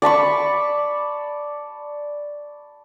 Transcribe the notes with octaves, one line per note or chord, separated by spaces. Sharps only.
D5 A5 B5 C#6